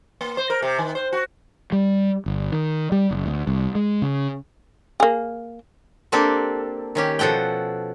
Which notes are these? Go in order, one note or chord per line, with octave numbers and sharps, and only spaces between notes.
A#3
C5
A#4
C3
D#3
C5
F#4
G3
G1
D#3
G3
F#1
D2
C2
G#3
C#3
A#3 G#4
A#3 C4 D4 G4 A4
D#3 C#4 G4
B2 F3 A4 F#5 G5